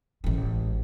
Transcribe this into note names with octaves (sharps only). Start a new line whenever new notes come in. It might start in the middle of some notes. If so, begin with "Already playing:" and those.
A1 G#3